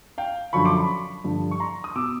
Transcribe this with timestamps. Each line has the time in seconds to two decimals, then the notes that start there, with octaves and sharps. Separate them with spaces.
0.18 F5 G5
0.53 F#2 D3 F3 B5 C#6
0.65 C6 D6
0.77 B5 C#6
1.24 G2 D3 F3
1.51 C#6
1.60 A#5 C6
1.84 D#6
1.96 B2 D6 E6